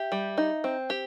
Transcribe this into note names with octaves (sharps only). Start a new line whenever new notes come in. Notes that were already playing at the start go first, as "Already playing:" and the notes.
Already playing: G4 E5
G3
D#4
C4
G4